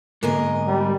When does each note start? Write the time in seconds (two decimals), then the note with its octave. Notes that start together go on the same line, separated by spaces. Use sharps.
0.23 G#2 D3 G#3 A#3 A#4 D#5
0.67 G3